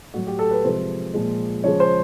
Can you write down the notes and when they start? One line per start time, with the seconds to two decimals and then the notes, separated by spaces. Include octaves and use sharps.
0.14 A2 F#3 F#4
0.27 G4
0.39 A4
0.51 B4
0.64 C3 F3 G#3 C5
1.13 A#2 F3 G#3
1.64 C#3 F3 G#3 C#5
1.80 C5